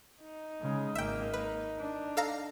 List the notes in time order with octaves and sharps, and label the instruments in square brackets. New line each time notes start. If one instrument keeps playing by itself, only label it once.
[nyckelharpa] D#4
[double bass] C#3 G#3
[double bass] G#1 A#3 [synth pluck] E5 G5
[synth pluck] B4
[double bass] D4
[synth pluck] A4 F5 A#5